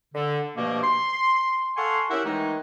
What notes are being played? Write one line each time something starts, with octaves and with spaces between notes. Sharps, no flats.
D3
G2 B2 F3 A3 A#3
C6
A4 F5 F#5 G#5 C6 C#6
C#4 E4 G4 A#4 E5 F#5
D#3 E3 G#3 A3 D#4